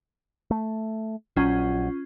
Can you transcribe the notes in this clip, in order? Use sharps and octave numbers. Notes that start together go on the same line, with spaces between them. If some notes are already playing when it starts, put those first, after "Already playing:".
A3
A#1 F#3 C#4 F4